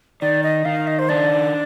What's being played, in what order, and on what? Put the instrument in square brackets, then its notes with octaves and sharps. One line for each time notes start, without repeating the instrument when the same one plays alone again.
[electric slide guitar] D#3 [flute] D5
[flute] D#5
[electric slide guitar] D#3 [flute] F5
[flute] D#5
C5
[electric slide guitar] D4 [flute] D5